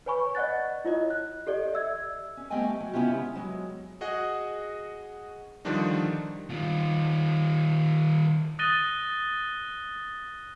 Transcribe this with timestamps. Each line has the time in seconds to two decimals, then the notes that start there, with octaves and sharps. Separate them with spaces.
0.06 B4 C#5 G#5 B5 C#6
0.35 D5 D#5 F#5 F#6 A6
0.84 E4 F4 C#5 D#5
1.10 F#6
1.47 G4 A4 D5 D#5
1.72 D5 E5 E6 G#6
2.37 C#4
2.50 G3 A3 B3 D#5 G5 G#5
2.80 F#3
2.93 C#3 B3 C#4 E4 F4 G4
3.14 G#3
3.35 F#3 G#3
4.01 F#4 G#4 D#5 F#5
5.65 D3 D#3 F3 G3 D4 D#4
6.50 D#3 F4
8.59 D#6 F#6 A6 A#6 D#7 G7